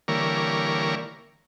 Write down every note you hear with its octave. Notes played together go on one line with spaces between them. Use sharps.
D3 E3 G3 A#3 A#4 C#5